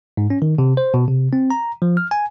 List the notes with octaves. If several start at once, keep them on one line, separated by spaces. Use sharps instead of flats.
G#2
C#4
D#3
C3
C5
B2
C3
C4
A#5
F3
F6
G#5